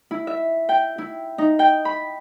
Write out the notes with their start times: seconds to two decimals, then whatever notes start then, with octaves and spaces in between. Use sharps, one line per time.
0.11 E4
0.27 E5
0.69 G5
0.98 E4
1.38 D#4
1.59 G5
1.85 B5